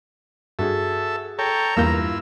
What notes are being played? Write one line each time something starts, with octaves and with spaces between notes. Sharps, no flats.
G2 F#4 G#4 A4 E5
A4 C#5 G5 A#5
E2 G2 A#3 E4 F4 E6 G6